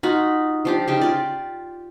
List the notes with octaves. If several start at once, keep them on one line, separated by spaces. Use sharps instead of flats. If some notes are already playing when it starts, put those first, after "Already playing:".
D#4 F4 F#4 B5
F3 D4 G4
C#3 D#4 G4
F4 D5